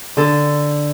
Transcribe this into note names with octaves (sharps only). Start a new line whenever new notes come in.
D3 A4